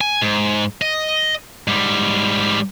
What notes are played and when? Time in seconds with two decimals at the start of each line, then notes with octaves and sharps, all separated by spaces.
0.01 G#5
0.22 G#2
0.82 D#5
1.68 G#2 G3